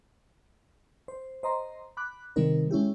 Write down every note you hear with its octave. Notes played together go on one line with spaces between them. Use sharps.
C5
C5 D#5 A#5 C6
B5 D6 F#6
C3 D#3 G3 C4 D#4 A#4
G#3 C#4 E4 G4